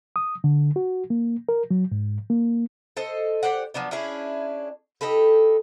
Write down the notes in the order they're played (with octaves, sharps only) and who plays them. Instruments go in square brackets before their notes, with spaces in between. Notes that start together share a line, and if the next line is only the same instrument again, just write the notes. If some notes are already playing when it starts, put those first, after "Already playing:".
[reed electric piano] D#6
D3
F#4
A#3
A#4
F#3
G#2
A#3
[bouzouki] A4 C5 D#5
G4 C5 D5 F#5
F3 F#3 B3 D4
C#4 D4 E4 G#4
D#4 G4 A4 B4